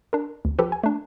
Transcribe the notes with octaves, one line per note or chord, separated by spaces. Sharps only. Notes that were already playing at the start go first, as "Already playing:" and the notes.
D4 A#4
D2
F3 G4 A4 B4
G#5
A3 D4